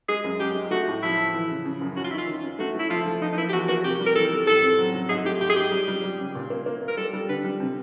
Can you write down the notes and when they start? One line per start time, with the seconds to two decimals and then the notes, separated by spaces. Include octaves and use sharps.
0.08 G#3 G#4
0.24 F#2
0.40 F#2 G4
0.55 G#3
0.71 A3 F#4
0.87 A2
1.02 F3 E4
1.17 F3
1.34 E3
1.50 C#3
1.65 C#3
1.81 F#2
1.96 C#4 F#4
2.04 F4
2.10 D#3 E4
2.18 F4
2.27 D#3
2.43 C#4
2.59 A3 F#4
2.75 A3 E4
2.90 F3 F4
3.06 A3
3.21 F3 D#4
3.33 D#4
3.37 A#3 E4
3.49 G4
3.53 E2 F#4
3.68 A#3 F#4
3.84 C3 G4
4.00 G3
4.07 A#4
4.15 E3 A4
4.31 G3
4.47 A2 A4
4.62 C4
4.78 F#3
4.94 F#3
5.09 G#2 G#4
5.25 A3 G4
5.41 G#2 G4
5.50 G#4
5.56 G#2 G4
5.72 G3
5.88 G3
6.04 G3
6.19 C#3
6.35 A#2
6.50 A#3
6.66 A#3
6.82 A#3
6.88 A#4
6.97 G3 A4
7.13 G3
7.29 D3 B4
7.44 G3
7.60 C3